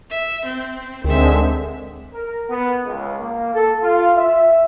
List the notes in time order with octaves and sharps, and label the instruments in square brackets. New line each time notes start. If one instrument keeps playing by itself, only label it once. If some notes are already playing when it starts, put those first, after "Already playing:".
[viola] E5
C4
[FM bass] D2 [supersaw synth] D3 G#3 C4 [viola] D#3 E5
[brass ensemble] A#4
B3
C#2
A#3
A4
F4
E5